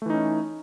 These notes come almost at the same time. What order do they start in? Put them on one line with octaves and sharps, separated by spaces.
A3 E3 D#4 C#4